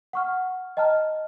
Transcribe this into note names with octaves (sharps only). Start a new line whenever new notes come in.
F#5 C#6 F6
D#5 G5 A5 A#5 F6